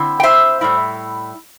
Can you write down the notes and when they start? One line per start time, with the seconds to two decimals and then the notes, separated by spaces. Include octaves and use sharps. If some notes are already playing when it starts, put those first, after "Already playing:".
Already playing: D3 C4 E4
0.20 G5
0.23 C5 E5
0.61 A2 G3 E4